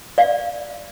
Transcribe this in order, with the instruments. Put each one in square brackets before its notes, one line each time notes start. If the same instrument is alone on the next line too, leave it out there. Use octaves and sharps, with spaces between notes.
[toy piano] D5 F5